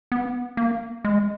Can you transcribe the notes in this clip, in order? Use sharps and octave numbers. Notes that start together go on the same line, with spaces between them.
B3
A#3
G#3